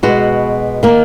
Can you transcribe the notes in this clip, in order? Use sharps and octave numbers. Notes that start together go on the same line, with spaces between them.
B2 G#3 B3 F#4
D#3 A#3